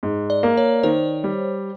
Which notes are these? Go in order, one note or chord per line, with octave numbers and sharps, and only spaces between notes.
G#2
D5
A#3
C#5
D#3 C5
G3